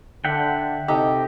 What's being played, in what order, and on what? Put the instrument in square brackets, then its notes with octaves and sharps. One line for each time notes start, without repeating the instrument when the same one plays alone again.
[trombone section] D3 [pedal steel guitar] E5 F#5 G5
[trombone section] C3 [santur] D#4 [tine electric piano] G4 A4